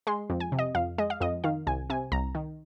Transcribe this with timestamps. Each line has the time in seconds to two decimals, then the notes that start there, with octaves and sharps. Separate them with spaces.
0.07 G#3 C6
0.30 F2
0.40 G#5
0.52 C3
0.59 D#5
0.75 F2 F5
0.98 G#3 D#5
1.10 F5
1.21 F2 D#5
1.44 D#3 F5
1.67 C2 G#5
1.90 C3 G#5
2.12 C2 A#5
2.35 D#3